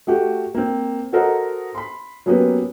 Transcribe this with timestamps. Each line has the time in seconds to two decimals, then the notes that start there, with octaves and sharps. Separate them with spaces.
0.07 A3 F#4 G4
0.55 A#3 C4
1.13 F#4 A4 A#4 C5 D#5 F#5
1.75 B5 C6
2.26 F#3 A#3 B3 C#4 G4 B4